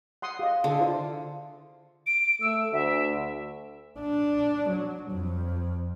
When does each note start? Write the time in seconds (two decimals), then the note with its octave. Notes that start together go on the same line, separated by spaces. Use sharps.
0.22 F#5 C6 D#6
0.39 G4 D#5 F5
0.64 D3 G#4 A4
0.79 E4 F4 C5
2.07 D7
2.41 A3 E6
2.72 D2 E5
3.99 D4
4.69 F#3
5.11 F2